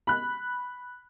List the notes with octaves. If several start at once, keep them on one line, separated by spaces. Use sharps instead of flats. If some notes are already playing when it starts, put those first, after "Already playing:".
B5 F#6